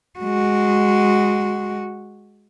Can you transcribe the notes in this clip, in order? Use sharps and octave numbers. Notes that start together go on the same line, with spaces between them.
G#3 F#4